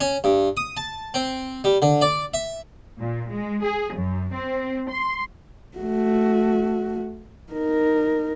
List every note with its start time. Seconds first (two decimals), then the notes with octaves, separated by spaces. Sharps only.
0.01 C#4
0.24 G2
0.57 D#6
0.77 A5
1.14 C4
1.64 G3
1.82 D3
2.01 D5
2.34 E5
2.99 A#2
3.31 G#3
3.63 G#4
3.94 F#2
4.33 C4
4.90 C6
5.78 A3 F#4
7.52 D#4 A#4